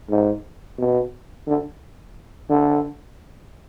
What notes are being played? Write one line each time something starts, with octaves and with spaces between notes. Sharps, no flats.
G#2
B2
D3
D3